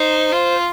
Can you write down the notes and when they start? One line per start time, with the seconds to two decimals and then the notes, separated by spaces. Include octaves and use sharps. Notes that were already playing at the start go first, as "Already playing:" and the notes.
Already playing: D#4 C5
0.32 F4